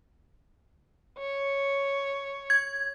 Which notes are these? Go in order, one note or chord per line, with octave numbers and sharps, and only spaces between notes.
C#5
G#6